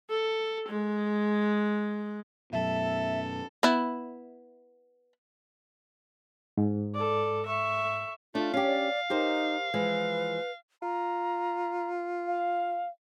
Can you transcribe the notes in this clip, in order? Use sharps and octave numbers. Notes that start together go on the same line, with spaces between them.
A4
G#3
F#2 B2 A4 E5
B3 E4
G#2
A4 D5
E5 C#6
A3 D4 F4
C#4 G4 F5
D5
D#4 G4 A#4 C5
E3 F3 G#3 B4
F4 A#5
F5